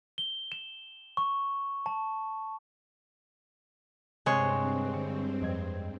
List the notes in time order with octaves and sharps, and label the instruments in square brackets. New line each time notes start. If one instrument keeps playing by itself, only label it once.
[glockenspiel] G7
E7
C#6
A5
[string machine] G2 C4 [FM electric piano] C3 C6 F#6 [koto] G#3 C#5
[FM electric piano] D3 C#6
F2 D#5 G#6